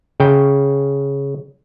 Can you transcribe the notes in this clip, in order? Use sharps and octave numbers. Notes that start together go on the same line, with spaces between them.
C#3 G5